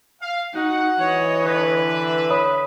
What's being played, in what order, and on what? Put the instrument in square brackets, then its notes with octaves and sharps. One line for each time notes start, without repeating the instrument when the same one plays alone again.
[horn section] F5
[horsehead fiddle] D#4 [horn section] F#4 F#5
[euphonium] E3 [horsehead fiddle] C#5 D#5
[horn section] D3 B4
[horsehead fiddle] E5
[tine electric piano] C#5 B5 D#6